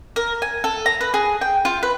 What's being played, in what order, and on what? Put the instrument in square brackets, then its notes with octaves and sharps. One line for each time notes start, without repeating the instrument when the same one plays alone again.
[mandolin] A#4
G#5
A4
A#5
B4
G#4
G5
F4
B4